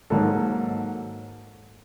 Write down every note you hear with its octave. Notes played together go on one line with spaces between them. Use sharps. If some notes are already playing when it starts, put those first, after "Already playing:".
G#2 D#3 F#3 A#3 A4